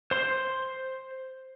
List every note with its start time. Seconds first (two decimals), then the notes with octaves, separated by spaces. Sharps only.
0.11 C5 C6